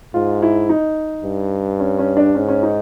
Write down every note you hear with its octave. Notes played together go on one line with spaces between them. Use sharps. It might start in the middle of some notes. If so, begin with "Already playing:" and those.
G#2 F4
E4
D#4
G2
C#4
C#4
D4
G#2 C#4
C#4
D#4